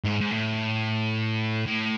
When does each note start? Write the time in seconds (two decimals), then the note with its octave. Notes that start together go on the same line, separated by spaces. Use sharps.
0.04 G#2
0.21 G#2
0.31 A2
1.66 A2